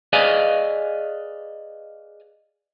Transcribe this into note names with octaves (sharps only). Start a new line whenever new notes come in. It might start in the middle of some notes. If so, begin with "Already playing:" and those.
G#4 B4 D5 D#5 F5 G#5